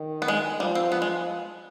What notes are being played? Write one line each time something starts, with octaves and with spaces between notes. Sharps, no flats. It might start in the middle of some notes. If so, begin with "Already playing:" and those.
Already playing: D#3
B3
G#3
F3 G3
C4
F3 B3
G#3